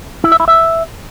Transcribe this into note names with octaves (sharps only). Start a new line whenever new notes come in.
E4
E5
E4
E5